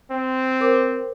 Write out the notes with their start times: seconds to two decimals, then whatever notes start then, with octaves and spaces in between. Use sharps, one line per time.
0.10 C4
0.61 A#4 C5 D6